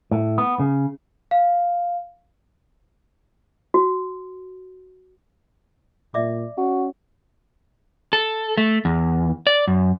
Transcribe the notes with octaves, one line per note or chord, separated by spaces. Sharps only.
A2
B3
C#3
F5
F#4
A#2 D5 E5 D6
C#4 F#4
A4
A3
E2
D5
F#2